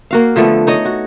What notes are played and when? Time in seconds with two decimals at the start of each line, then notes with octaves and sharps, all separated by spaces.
0.11 A#3 F#4 F5
0.36 D3 F3 A3 B3
0.67 D#4 C#5 D#5
0.85 F#4